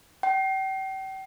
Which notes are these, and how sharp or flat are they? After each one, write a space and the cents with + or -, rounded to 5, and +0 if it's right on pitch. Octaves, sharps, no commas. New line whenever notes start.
G5 -35